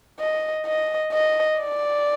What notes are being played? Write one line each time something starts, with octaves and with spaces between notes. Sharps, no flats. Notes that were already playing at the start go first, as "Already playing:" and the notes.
D#5
D#5
D#5
D5